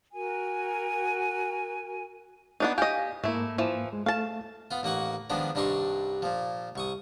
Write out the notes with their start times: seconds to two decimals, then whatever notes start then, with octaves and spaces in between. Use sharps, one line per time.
0.13 F#4 A#4 G#5
2.60 B3 D4 D#4
2.78 G4 D#5 F5 G#5
3.24 G#2 A3 A#3 E4
3.58 E3 F3
3.93 G#3
4.06 A3 F5 A5
4.71 B3 F4
4.83 A1 A#3 D#4 F#5 C#6
5.30 D#3 F3 G#3 B3 D4
5.55 C2 G2 D4 D#4 C6 C#6
6.22 A#2 F3
6.76 C2 C#6 D#6